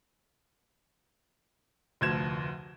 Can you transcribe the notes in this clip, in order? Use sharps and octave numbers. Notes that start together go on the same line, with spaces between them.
F1 D2 F3 G#6 E7